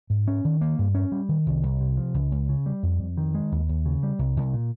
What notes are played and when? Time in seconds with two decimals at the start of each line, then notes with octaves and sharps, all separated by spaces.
0.10 G#2
0.28 C#4
0.45 D#3
0.61 A#3
0.79 G2
0.95 C#4
1.12 G3
1.29 D#3
1.46 C2
1.63 C2
1.81 C3
1.97 F3
2.14 C#2
2.32 C#2
2.49 C#3
2.66 G3
2.83 F2
2.99 F2
3.18 D#3
3.34 G#3
3.52 D#2
3.69 D#2
3.85 C#3
4.03 G3
4.19 C2
4.37 C2
4.54 A#2